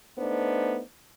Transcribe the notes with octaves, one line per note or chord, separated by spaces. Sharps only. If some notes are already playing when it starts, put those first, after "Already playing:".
A3 B3 D4 D#4 C5